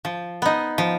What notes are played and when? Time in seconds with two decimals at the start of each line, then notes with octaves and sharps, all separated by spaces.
0.05 F3
0.42 B3 D#4
0.78 F3